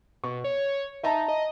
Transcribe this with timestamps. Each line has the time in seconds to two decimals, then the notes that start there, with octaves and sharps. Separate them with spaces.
0.24 B2 C#6
0.44 C#5
1.03 D#4 E5 A5 A#5
1.28 D#5